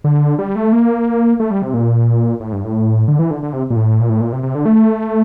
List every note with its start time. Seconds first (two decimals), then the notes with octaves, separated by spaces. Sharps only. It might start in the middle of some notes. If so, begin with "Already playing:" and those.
0.04 D3
0.39 G3
0.56 A3
0.73 A#3
1.40 A3
1.51 G3
1.62 C3
1.74 A#2
2.40 A2
2.52 G2
2.64 A2
3.08 D3
3.19 E3
3.31 D3
3.43 D3
3.53 C3
3.70 A#2
3.76 A2
4.00 A#2
4.10 A2
4.21 A#2
4.33 C3
4.43 C3
4.55 D3
4.65 A3